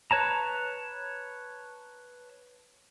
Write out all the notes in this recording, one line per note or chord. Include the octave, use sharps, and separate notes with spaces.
B4 C#5 A5 A#5